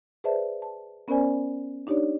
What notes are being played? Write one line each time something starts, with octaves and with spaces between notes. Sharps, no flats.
G#4 B4 C5 D5 E5 A5
A5
B3 C#4 A#4 C5 D5 G#5
D4 D#4 G4 C#5 D5